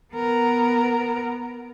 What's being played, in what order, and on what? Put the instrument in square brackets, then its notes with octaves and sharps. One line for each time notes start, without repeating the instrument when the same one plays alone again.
[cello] B3 A#4